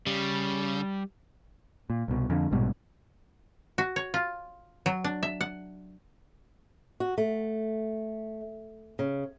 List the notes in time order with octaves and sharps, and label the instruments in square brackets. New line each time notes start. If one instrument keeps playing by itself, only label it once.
[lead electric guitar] C#3 [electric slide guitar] G3
[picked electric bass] A#2
C2 B2
F2 D3
A#1 G#2 B2 G3
[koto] F#4
C#5
F4
F#3
D4
E5
F#5
[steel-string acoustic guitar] F#4
A3
C#3